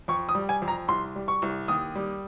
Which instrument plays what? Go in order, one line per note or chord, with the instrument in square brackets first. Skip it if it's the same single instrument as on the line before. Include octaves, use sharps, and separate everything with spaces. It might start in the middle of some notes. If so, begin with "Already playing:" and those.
[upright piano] F2 C#6
D#6
G3
G#5
F2
A#5
C2 C6
G3
C#6
C2
D#2 D#6
G3